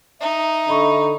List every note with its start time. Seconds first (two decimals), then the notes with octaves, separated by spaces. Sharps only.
0.21 D#4 E5
0.69 D3 D#5 B5 C#6